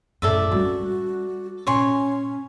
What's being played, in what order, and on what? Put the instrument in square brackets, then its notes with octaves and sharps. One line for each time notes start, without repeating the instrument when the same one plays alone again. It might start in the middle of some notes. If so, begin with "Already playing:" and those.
[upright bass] F#2 A2 [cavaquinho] A4 D5 E5
[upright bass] G3 C#4 [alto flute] F#4
[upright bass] A#2 [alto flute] C#4 [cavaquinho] C#5 G#5 C6